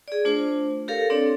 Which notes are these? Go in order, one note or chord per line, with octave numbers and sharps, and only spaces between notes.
G#4 D5
A3 D4 F4 C5
G4 A4 A#4 C#5 F5
C4 D4 A4 C#5 D5